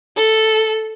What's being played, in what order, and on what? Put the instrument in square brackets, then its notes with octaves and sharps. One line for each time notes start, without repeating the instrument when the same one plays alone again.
[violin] A4